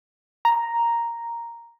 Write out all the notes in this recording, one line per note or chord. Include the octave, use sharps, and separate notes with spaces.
A#5